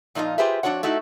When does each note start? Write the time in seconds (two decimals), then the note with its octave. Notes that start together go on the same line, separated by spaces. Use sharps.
0.15 A#2 F3 D#4 F4 D#5
0.38 F4 G4 G#4 B4 C5 E5
0.63 F2 D#3 D4 F#4 C#5 F#5
0.83 A3 D#4 E4 F#4